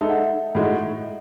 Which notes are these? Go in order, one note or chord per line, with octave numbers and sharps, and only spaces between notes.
G#3 D#4 A4 E5
F#5
E5
A2 G#3 D#4 F#4